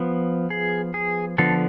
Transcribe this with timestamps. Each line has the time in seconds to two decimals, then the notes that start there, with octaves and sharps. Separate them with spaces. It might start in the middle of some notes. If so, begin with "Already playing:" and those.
Already playing: F3 B3
0.50 G#4
0.94 G#4
1.38 D3 F3 B3 A4